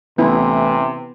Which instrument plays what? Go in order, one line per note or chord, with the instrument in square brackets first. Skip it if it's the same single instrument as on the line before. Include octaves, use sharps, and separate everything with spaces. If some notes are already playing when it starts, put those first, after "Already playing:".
[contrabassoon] A1 [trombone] C3 [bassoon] E3 [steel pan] B3 E4